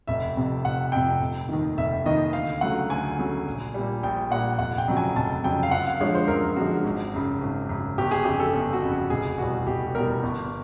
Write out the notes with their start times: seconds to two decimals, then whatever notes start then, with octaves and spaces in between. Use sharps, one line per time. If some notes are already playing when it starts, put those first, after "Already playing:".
0.07 F1 E5
0.37 F2 C3
0.65 F1 F#5
0.92 F2 C3 G5
1.21 F1
1.49 D#2 D#3
1.77 F1 E5
2.06 D#2 D#3 D#5
2.33 D2 F5
2.61 C#3 F#3 A3 F#5
2.90 D2 G#5
3.19 C#3 F#3 A3
3.47 A#1
3.74 A#2 G3
4.03 A#1 G5
4.30 A#2 G3 F#5
4.59 F1 F#5
4.78 G5
4.88 F2 C#3 F#3
4.97 G#5
5.16 F1 A5
5.44 F2 C#3 F#3 G5
5.63 F5
5.71 F#2 F#5
5.87 F5
6.01 D3 F3 G#3 C#5
6.15 C5
6.28 F#2 A#4
6.56 D3 F3 G#3 F#4
6.84 G#1
7.13 F#2 C#3
7.41 G#1
7.69 F#2 C#3
7.98 G1 G4
8.11 G#4
8.25 F2 C#3 G4
8.40 A4
8.53 G1
8.73 F#4
8.82 F2 C#3
8.92 F#4
9.10 F1 G#4
9.38 E2 B2 G3 F#4
9.67 F1 G4
9.95 E2 B2 G3 A#4
10.23 G1